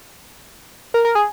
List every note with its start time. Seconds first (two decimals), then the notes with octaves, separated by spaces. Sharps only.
0.94 A#4
1.05 A#4
1.15 G#4